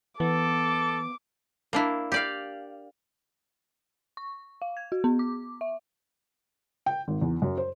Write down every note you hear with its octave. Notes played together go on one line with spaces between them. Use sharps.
E3 B3 A4 D6
A#3 D4 E4
G4 D5 F5
C#6
F5
G#6
F#4
B3
D6
E5
G5
G#1
E2
F#2
C5